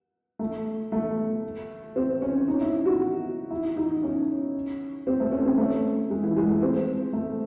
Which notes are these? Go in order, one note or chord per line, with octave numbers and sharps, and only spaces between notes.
A3
A3
C4
C#4
D#4
E4
F#4
E4
D#4
C#4
C4
A3
C#4
C4
A3
G#3
E3
G#3
A3
C4
A3